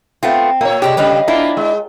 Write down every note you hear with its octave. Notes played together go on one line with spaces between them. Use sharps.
A3 B3 C4 F4
A#2 A#3 C#5
C3 G#3 D4 G4
C#3 G3 D#4 B4 F5
A#3 D4 E4 F4
G#3